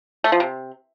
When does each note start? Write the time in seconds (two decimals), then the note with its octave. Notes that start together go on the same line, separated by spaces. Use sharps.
0.24 A3
0.32 F3
0.40 C3